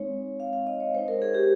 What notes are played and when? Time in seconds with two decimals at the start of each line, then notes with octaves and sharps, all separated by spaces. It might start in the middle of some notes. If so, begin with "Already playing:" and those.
Already playing: G#3 C4 D#4 C#5
0.40 F5
0.53 F5
0.67 D#5
0.80 C#5
0.94 G#3 D#4 C5
1.08 A#4
1.22 G#4
1.34 G4